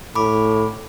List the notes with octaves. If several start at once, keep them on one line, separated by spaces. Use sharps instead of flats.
A2 B5 D6